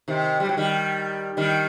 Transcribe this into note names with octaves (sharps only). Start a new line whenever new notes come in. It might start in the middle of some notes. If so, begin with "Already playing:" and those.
C3 D#3
G3
F#3
D#3 G3
D#3 G3